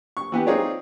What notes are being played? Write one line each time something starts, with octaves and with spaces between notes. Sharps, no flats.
C#6
E3 B3 G4
C4 D#4 F4 G#4 C#5 D5